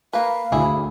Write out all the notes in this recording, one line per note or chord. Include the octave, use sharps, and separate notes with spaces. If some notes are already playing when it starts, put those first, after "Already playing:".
A#3 B4 F5
D2 E4 G#4